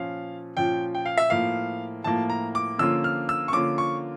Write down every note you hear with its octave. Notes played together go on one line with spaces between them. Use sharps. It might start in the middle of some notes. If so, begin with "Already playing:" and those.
Already playing: A#2 F3 C#4 F5
A#2 F3 C#4 G5
G5
F5
E5
A2 F3 A#3 F5
A2 F3 A#3 A5
A#5
D6
D3 F3 A#3 C#4 F4 E6
F6
E6
C#6
D3 F3 A#3 C#4 F4 D6
C#6